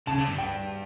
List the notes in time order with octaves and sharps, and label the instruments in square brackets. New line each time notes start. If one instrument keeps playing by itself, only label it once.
[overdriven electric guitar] C#3 [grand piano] A5
[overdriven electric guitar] D3
G2
[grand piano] G5